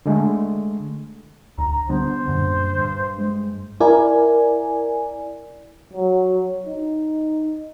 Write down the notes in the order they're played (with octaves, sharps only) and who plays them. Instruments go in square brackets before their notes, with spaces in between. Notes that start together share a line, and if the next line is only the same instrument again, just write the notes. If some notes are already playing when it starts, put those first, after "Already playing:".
[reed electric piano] D3 G#3 A3
[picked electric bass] D2 [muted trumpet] A#5
[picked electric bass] D3 B3 [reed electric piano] G3 D4 [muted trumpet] C5
[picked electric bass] F#2 A#2 D3
G2
[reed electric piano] G#3
[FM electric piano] E4 A#4 D5 G#5
[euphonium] F#3
D#4